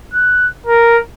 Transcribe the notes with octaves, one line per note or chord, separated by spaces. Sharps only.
F#6
A#4